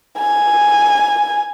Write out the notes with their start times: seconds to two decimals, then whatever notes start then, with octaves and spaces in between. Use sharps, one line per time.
0.18 G#5